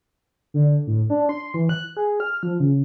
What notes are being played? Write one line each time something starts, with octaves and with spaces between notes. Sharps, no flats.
D3
A2
D4
C6
E3
F#6
G#4
F6
F3
C#3